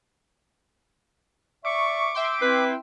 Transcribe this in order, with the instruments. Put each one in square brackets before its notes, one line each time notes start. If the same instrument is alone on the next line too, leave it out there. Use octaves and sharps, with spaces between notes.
[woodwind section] D5 E5 C#6 [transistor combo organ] D6
[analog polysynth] E5 G5 C6
[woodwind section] C4 E4 [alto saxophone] B4